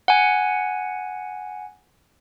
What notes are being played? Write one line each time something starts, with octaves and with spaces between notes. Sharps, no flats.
F#5 G#5